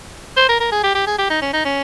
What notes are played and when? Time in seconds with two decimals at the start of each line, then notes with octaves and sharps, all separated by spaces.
0.37 C5
0.49 A#4
0.60 A#4
0.72 G#4
0.84 G4
0.95 G4
1.07 G#4
1.18 G4
1.30 D#4
1.42 C#4
1.53 D#4
1.65 C#4